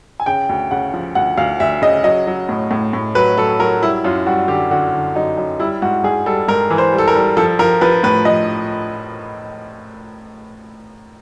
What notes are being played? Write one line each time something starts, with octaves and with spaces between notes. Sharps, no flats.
G#5
C#3 G5
D2
C#3 F#5
F3
D2 F#5
D2 F5
D2 E5
C#3 D#5
F#3 D#5
F#3
A2
A2
A2
F#3 B4
F#3 A4
F#3 A#4
G3 E4
F#2 F4
G3 F#4
D3 G4
D3 F#4
D3
F#2 D#4
F#2
G3 E4
G#2 F#4
G#2 G#4
G3 A4
G#2 A#4
E3
C5
G3
A4
A#4
G3
F3 A4
F3 A#4
F3 B4
A2 B4
F3 D#5